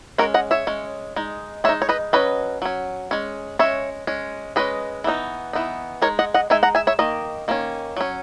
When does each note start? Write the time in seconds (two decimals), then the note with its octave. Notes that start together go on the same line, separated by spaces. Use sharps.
0.18 G#3 C#4 F#4 A#4
0.34 D#5 F#5
0.51 C#5 E5
0.67 G#3 C#4
1.16 G#3 D#4
1.64 G#3 C#5 E5
1.69 D#4
1.82 C#5
1.89 B4 D#5
2.13 F#3 C#4 B4 D#5
2.62 F#3 C#4
3.11 G#3 C#4
3.59 G#3 C#4 C#5 E5
4.07 G#3 C#4
4.56 G#3 C#4 B4 D#5
5.04 E3 B3 D#4
5.53 E3 B3 D#4
6.02 G#3 D#4 A#4 C#5
6.19 D#5 F#5
6.34 D#5 F#5
6.50 G#3 D#4 E5 G#5
6.63 F#5 A#5
6.75 E5 G#5
6.87 C#5 E5
6.99 D#3 A#3 D#5
7.48 D#3 A#3 C#4
7.96 F#3 C#4